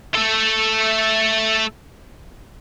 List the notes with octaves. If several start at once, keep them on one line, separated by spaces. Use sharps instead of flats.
A3 A4